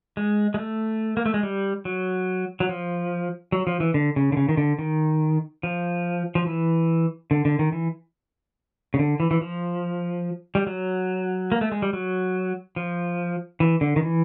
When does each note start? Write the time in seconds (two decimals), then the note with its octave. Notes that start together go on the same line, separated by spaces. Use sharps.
0.17 G#3
0.54 G#3
0.58 A3
1.17 A#3
1.26 A3
1.34 G#3
1.43 G3
1.85 F#3
2.60 F#3
2.69 F3
3.52 F#3
3.67 F3
3.80 E3
3.94 D3
4.16 C#3
4.32 D3
4.37 C#3
4.49 D#3
4.57 D3
4.79 D#3
5.63 F3
6.35 F3
6.46 E3
7.31 D3
7.45 D3
7.59 D#3
7.72 E3
8.94 C#3
8.99 D3
9.20 E3
9.31 E3
9.41 F3
10.55 G3
10.67 F#3
11.52 A#3
11.61 A3
11.72 G#3
11.82 G3
11.93 F#3
12.76 F3
13.60 E3
13.81 D3
13.96 D#3
14.03 E3